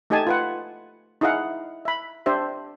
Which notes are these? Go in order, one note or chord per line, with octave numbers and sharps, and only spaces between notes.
A3 D#4 G4 D#5 G#5 A5
F4 B4 F#5
D#4 E4 G#4 D#5 F5 F#5
E5 B5
D4 G4 C5 E5